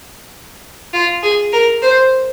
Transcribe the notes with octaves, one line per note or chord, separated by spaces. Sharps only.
F4
G#4
A#4
C5